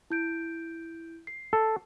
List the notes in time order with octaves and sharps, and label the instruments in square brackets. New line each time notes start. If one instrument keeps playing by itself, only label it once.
[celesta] E4 G6 D7
C7
[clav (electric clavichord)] A4